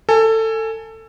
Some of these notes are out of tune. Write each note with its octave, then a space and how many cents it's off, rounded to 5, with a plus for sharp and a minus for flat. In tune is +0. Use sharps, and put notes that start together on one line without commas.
A4 +20 G#5 +10